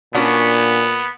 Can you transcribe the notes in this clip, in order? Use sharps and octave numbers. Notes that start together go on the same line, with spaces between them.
A#2 B3 C#4 D4 F#4